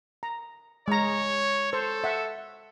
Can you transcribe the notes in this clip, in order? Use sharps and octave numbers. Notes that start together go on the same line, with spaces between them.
A#5
G#3 C#5 A#5
A4 C5
E5 F#5